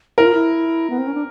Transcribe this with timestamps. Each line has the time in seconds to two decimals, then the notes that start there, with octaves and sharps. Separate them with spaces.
0.18 E4 A#4
0.26 F4
0.34 E4
0.90 B3
0.98 C4
1.07 C#4
1.14 D4